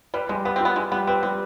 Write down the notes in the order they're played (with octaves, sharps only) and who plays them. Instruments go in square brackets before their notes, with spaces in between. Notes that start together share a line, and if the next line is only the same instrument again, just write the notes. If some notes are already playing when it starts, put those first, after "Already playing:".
[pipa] G3 [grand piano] B4
[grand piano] G3 [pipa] G#3
[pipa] B3 [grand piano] B4
[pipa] C4
[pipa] B3 [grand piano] F4
[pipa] G#3 [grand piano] F4
[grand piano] G3 [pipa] B3
[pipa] C4 [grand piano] B4
[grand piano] G3 [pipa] C4